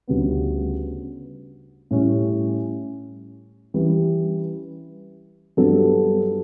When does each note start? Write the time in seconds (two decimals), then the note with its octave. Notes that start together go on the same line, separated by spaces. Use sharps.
0.08 D2 C#3 G3 B3
1.91 A2 G3 C#4
3.74 E3 G3 C#4
5.57 G2 F#3 B3 D4 A4